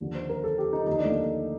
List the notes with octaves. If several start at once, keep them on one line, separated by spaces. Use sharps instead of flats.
D#2 D3 F3
C5
A#4
A4
G4
D#4
D#2 D3 F3 D#4
D4
A3
A#3